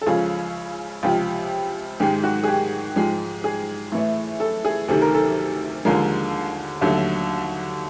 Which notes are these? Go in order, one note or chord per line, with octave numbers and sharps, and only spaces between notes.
A4
C#2 C#3 F3 G#4
C#2 C3 F3 G4
G#2 D#3 G#3 G4
F#4
G#4
G4
G#2 F3 G#3
G#4
A2 E3 A3
A4
G#4
D2 C3 D#3 A4
A#4
A4
D#2 D3 F3 G#3 A#4
D#2 D3 F#3 A3